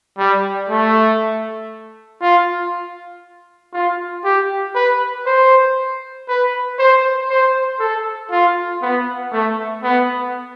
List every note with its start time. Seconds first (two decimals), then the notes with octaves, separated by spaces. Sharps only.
0.18 G3
0.69 A3
2.22 F4
3.73 F4
4.24 G4
4.75 B4
5.26 C5
6.28 B4
6.79 C5
7.30 C5
7.80 A4
8.31 F4
8.82 B3
9.32 A3
9.83 B3